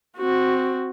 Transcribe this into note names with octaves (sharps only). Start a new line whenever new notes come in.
C4 F#4